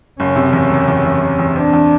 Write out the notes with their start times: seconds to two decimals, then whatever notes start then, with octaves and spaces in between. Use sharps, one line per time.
0.19 F#1 C#4
0.36 C3
0.53 E2 C#4
0.71 F#1
0.88 E2
1.05 E2
1.21 F#1
1.39 E2
1.56 C4 D4
1.73 E2